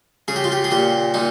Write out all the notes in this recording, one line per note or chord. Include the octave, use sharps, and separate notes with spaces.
C#3 G#4
G4
F4
G4
G#4
A#2 G4
A#2 D#4